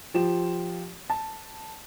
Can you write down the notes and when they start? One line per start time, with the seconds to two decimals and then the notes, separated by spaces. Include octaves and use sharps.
0.14 F3 F4 G4 E7
1.10 A5